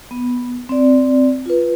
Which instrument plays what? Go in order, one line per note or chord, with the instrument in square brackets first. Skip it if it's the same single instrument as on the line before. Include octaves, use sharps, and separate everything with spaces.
[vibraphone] B3
C4 D5
F4 B4